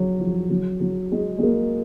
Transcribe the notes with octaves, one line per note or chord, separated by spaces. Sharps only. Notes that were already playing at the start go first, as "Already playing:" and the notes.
Already playing: F#3
F3
F#3
F#3
G#3
G#3
A#3